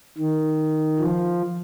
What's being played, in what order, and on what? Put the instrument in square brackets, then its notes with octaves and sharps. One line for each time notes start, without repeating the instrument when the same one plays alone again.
[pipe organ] D#3
F3